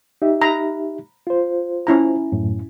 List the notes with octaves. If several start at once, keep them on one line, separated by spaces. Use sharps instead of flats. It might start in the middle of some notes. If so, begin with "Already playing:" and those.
D#4 G4 E5
A#5 B5
F4 C5
C#4 E4 A#5
F#2 A2